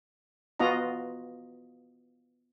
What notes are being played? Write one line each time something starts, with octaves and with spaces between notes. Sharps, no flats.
B3 F4 F#4 D#5 A#5